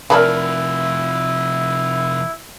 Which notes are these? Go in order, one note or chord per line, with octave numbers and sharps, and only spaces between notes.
C3 E3 F3 D4 E4 A#4 B5